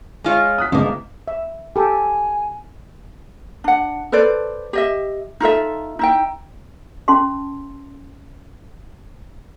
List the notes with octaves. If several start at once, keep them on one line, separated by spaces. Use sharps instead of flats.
G#3 F4 C#5
D#6 F#6 B6
G1 C#2 G#2 F3 A#3
E5
G4 A4 G#5
D4 F#5
A4 B4 C5 D5
G4 D#5 E5
D#4 F4 A4 E5
D#4 E4 G5
C#4 A5 C6